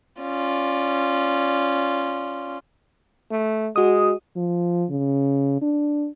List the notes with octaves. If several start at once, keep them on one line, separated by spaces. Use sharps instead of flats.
C#4 F4 D5
A3
G#3 F#4 D#6
F3
C#3
D4